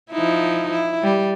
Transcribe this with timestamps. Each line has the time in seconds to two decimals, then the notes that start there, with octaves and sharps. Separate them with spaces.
0.12 F3 D#4 E4
0.71 E4
1.03 G3